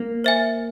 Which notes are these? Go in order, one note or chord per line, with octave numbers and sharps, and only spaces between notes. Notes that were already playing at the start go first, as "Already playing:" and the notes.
Already playing: A#3
C5 E5 G#5